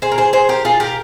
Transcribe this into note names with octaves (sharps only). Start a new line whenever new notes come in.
G#4 C5
A#4
G#4 C5
G#4 C5
G4 A#4
F4 G#4
G4 A#4